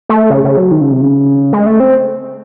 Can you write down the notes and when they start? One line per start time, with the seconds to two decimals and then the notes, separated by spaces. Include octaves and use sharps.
0.09 A3
0.30 C#3
0.44 C#3
0.57 F#3
0.71 D#3
0.81 C#3
0.91 C3
1.01 C#3
1.53 G#3
1.66 A3
1.80 C4